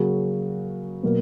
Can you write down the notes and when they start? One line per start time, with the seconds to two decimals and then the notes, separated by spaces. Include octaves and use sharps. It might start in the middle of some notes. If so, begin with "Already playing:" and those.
Already playing: C#3 F#3 A#3 C#4 F#4
1.03 B2 F#3 A#3